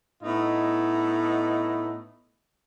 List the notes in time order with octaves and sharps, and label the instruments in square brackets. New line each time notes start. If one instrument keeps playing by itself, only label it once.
[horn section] A2 B3 D#4 E4 D#5